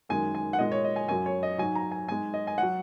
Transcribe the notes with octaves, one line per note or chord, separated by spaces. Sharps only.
F#2 D#3 G#3 G#5
G#5
F#5
A#2 G#3 D#5
C#5
D#5
G#5
F#2 F#3 G#5
C#5
D#5
G#2 F#3 G#5
A#5
G#5
G#2 G#3 G#5
D#5
G#5
F#3 F#5